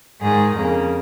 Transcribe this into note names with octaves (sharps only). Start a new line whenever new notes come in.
G#2 D#3 G#4
F2 C#3 A#3